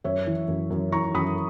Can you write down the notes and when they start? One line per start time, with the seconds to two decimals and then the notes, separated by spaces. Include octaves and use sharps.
0.04 F#2 C#5 E5
0.27 E3
0.48 F#2
0.70 F#2
0.92 E3 A#5 C#6
1.14 F#2 B5 D#6